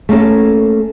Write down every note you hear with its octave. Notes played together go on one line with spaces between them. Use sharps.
A3 A#3 C#4 A4